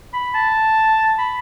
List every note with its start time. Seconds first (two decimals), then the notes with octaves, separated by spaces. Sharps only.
0.14 B5
0.34 A5
1.18 B5